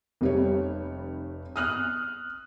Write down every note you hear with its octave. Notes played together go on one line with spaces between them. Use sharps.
F1 G3 C#5
D#6 F6 F#6